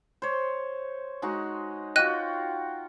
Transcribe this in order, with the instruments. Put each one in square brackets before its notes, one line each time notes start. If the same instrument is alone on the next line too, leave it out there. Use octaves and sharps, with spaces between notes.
[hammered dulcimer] C5 C#5
G#3 D#4 F#4
[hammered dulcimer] F4 F#4 G5 [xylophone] D#5 F#6 D#7